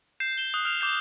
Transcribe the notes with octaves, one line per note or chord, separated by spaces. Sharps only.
G6 C7 E7
E7 G7
D#6 F#6
F6 G6 F7
D6 G6 C7